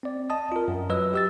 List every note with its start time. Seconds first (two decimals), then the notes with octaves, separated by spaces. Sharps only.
0.03 C4 D5
0.30 D#5 A5 D#6
0.52 F4 A#4
0.68 F#2
0.89 F#3 B4 D#5 E6
1.14 G4 E6 A6